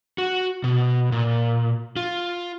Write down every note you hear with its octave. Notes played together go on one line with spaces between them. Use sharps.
F#4
B2
A#2
F4